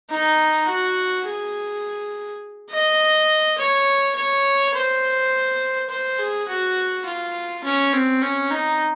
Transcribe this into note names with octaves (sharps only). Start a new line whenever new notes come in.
D#4
F#4
G#4
D#5
C#5
C#5
C5
C5
G#4
F#4
F4
C#4
C4
C#4
D#4